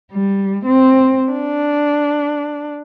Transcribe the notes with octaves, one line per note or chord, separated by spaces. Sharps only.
G3
C4
D4